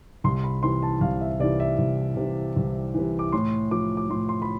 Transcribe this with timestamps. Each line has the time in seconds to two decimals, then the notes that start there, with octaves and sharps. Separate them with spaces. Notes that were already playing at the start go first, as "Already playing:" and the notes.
0.24 C2 C6
0.44 B5
0.63 C3 E3 C6
0.83 A5
1.01 C2 F5
1.21 E5
1.40 C3 D5
1.44 E3
1.60 E5
1.79 C2
2.17 C3 E3
2.56 C2
2.94 C3 E3
3.19 D6
3.32 A2 C6
3.71 F3 D6
3.97 D6
4.10 A2 C6
4.29 C6
4.42 B5